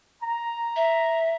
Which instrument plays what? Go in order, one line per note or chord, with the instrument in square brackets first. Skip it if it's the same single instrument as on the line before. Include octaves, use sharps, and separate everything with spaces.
[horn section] A#5
[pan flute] E5